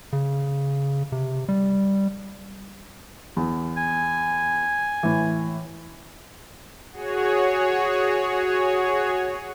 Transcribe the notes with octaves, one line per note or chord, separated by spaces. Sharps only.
C#3
C3
G3
E2
G#5
A2 E3
F#4 G#4 C#5